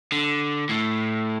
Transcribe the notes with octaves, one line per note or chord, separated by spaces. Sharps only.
D3
A2 A3